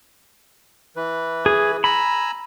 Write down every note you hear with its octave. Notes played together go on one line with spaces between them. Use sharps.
E3 B4
G#4
G#5 A#5 B5 E6